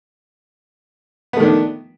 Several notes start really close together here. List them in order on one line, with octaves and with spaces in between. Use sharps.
B3 A3 D#3 D4